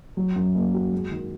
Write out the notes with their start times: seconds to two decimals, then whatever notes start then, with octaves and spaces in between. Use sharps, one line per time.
0.17 F#3
0.36 F#2
0.55 A#3
0.74 F#4
0.93 G#3
1.11 D#3